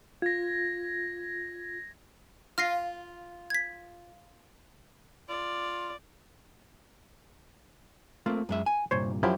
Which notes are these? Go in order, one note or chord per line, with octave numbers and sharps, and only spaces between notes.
F4 G#6 A#6
F4 F6 A#6 C7
G#6 B6
F4 D5
A3 A#3 C4 F4
F#2 G#3 E5
G#5
C2 G2 A#2 C5 C#5
F#2 F3 F#3 E4 G4